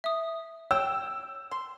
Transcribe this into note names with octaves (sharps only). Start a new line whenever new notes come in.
E5 D#6
C#5 G5 E6
C6